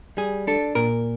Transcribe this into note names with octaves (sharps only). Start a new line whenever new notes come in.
G3 G#4
D4 A4
A#2 A#4